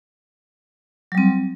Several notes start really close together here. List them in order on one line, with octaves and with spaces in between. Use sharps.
F#3 G3 C4